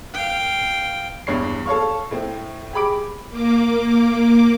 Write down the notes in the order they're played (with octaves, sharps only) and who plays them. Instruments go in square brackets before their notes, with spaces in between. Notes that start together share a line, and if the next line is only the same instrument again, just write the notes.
[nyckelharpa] F5 G5
[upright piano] E2 G2 C#5 C7
A4 C#5 F5 C#6
A2 C4
G4 G#4 B5 D6 D7
[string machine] A#3 D6